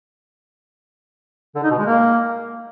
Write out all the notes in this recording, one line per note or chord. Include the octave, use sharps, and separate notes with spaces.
D3
D#4
B2
G#3
A#3